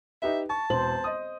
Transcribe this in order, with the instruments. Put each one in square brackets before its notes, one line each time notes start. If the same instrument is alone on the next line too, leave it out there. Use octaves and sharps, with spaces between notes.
[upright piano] D#4 G4 B4 [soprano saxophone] E5
[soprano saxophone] A5 [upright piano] C#6
[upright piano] E1 F#7 [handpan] C5
[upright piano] D#5 D#6